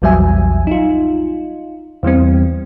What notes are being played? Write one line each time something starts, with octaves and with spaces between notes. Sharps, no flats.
A#1 E2 F#3 G3 E5 G#5
D#4 F4
E2 E3 G3 C4